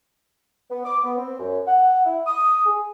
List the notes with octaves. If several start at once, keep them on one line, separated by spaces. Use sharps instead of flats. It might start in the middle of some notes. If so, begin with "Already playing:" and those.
B3
D6
B3
C4
F#2
F#5
E4
D#6
G#4